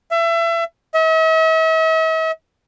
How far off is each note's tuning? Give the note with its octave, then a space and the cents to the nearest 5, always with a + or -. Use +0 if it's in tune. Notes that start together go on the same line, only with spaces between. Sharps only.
E5 +30
E5 -45